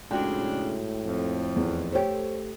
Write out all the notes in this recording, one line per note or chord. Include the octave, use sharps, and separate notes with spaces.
F2 A2 C#3 G#3 D4 F#4 G5
F2
E2
A3 G4 C5 C#5